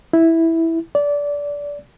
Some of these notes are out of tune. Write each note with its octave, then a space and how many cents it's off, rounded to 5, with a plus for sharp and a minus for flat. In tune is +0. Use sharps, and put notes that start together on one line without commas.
E4 -5
D5 -20